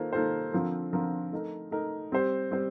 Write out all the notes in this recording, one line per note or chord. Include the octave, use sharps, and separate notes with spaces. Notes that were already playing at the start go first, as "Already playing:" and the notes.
Already playing: D#3 A#3 F4 A4 C5
D#3 A#3 F4 A4 C5
D3 F3 C4 F4 A#4
D3 F3 C4 F4 A#4
A3 D#4 A#4
A3 D#4 A#4
G3 C4 G4 C5
G3 C4 G4 C5